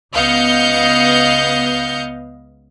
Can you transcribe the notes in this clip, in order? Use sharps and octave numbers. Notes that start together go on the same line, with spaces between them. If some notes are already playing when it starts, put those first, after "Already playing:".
C#2 B3 D#5 F5 G6 C#7